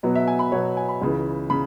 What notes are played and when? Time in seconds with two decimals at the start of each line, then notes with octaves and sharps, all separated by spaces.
0.03 B2 F#3 B3
0.15 E5
0.27 G#5
0.39 B5
0.52 B2 F#3 B3 C#5
0.77 G#5
0.89 B5
1.02 C#2 C#3 E3
1.50 C#3 B5